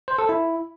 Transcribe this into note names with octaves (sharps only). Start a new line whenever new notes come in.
C5
A4
E4